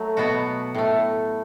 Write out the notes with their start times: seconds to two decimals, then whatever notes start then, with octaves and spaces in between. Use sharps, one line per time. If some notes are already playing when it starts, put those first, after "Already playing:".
Already playing: F#3 A3
0.17 B2 B3 F#4
0.75 A2 A3